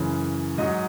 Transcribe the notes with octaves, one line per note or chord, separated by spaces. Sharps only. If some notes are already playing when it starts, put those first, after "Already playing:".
Already playing: F#2 C#3 E3
G#2 F#3 D#5